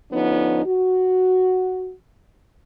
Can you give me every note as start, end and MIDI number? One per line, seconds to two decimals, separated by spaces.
0.11 0.62 50
0.11 0.62 53
0.11 0.62 59
0.11 0.62 61
0.11 0.62 63
0.66 1.92 66